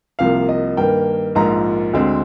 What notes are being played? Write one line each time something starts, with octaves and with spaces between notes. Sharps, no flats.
C2 C3 F3 A#3 F5
D#5
G2 D#3 A#3 G5
A#1 G#2 F3 A#3 A#5
D2 D3 G#3 C4